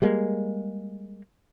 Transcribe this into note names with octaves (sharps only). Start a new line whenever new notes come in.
G3 G#3 A#3